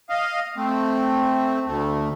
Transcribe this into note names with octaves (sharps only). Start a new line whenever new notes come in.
D#5 F5
A3 C4
D2 A3